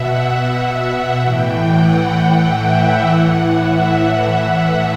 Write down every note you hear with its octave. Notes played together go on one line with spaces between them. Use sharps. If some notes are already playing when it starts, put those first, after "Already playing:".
Already playing: B2 E5 F#5
F#5
A2 E3 G5
F#5
F#5
E5
A2 E3 F#5
E5